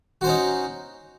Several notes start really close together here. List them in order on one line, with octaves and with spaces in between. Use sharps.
F#4 C5 C#4 D#4